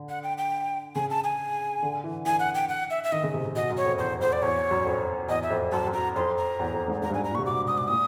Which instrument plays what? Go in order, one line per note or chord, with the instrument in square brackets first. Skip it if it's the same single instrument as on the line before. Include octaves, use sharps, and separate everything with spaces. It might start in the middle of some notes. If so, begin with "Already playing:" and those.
Already playing: [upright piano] D3
[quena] F#5
G5
G5
[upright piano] C#3 [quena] G#5
[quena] A5
G#5
[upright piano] D3
E3
[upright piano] E3 [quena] G#5
[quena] F#5
G5
F#5
E5
E5
[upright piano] D#3 [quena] D#5
[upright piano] C#3
C3
C3
[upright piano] B2 [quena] D#5
[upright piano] F#2
[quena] C#5
[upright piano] F2
[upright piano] E2 [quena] C5
[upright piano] F2 [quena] C5
[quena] D5
[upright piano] E2 [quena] C#5
[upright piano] F#2
F2
[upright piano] E2 [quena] D#5
[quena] E5
[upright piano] F2
[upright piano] F#2 [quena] A5
[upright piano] F#2
[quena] A#5
[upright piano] F2 [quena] C6
[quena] A#5
[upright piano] E2
F2
G#2
[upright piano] G#2 [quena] A#5
[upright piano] G2
[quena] G#5
[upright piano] G#2
[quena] A#5
[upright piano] A#2 [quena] C#6
[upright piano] C3
[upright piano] B2 [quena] D6
[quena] D#6
D6
[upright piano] A#2 [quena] D#6